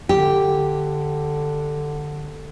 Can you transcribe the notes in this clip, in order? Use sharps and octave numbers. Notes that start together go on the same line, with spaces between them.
D3 G4